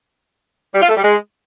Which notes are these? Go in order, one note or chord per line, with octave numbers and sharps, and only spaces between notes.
G3
F4
A3
G3
G#3